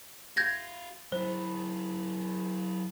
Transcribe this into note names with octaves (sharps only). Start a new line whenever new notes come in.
F#4 F5 G6 G#6 A#6
F#3 E4 C5